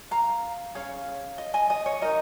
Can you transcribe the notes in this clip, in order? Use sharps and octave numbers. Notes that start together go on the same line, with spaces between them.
F5 A#5
C#4 G#4 C#5 F5
D#5
D#5 G#5
D#5
C#5
D#4 A#4 D#5